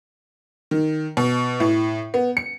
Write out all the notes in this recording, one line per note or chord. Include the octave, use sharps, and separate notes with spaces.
D#3
B2
A2
B3
C#7